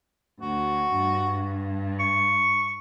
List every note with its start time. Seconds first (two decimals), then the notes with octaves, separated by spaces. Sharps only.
0.41 D2 F#4
0.93 G2
1.99 C#6